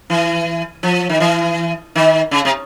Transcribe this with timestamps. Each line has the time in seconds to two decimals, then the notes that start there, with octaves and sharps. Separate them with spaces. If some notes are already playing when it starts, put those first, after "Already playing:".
0.10 E3
0.83 F3
1.09 D#3
1.20 E3
1.95 D#3
2.31 C#3
2.45 C3